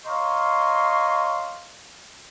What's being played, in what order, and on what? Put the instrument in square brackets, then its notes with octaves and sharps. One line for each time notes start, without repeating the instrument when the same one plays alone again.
[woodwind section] C#5 D#5 F5 A#5 C6 C#6